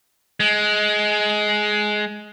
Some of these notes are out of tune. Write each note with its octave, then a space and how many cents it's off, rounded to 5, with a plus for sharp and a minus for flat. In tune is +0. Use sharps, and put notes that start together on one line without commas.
G#3 +15